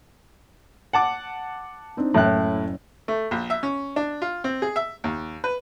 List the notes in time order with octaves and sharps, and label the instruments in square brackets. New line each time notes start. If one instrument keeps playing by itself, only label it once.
[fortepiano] F#5 A5 D6
[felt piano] C4 D4 D#4
[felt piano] F#1 C#4 G5 [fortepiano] A2 E4 F#6
[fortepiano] A3
A#1
E5
C#4
D4
F4
C4
G#4
E5
D#2
B4